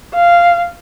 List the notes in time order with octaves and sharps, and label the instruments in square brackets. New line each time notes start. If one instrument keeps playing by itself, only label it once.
[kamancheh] F5